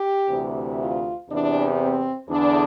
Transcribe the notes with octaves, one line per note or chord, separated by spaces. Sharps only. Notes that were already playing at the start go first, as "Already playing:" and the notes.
Already playing: G4
D2 C3 E3
F4
E2 C3 E3 D4
C4
E2 D3 D4